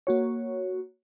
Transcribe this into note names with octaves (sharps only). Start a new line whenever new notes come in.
A#3 F#4 C#5